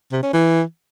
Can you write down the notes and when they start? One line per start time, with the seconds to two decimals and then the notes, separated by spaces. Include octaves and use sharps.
0.12 C3
0.23 C#4
0.33 E3